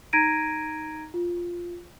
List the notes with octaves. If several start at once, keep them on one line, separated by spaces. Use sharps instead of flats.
D#4 A#5 G#6 A#6 D7 D#7
F4